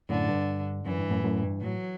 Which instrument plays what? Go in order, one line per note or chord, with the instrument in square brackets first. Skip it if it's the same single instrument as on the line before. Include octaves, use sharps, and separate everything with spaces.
[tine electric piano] F#2 A2 [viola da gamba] D3
[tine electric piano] G2
[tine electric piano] F#2 [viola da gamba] E3
[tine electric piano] G2
F#2 A2
F#2 A2
G2
[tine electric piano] A2 [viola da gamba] F#3